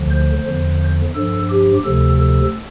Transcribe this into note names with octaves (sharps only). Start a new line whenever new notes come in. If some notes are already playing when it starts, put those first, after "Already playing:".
Already playing: D2 D3 F3
C5
E2 D3 F3
G2 F3 A4
G4
D2 C3 F3 A4
A4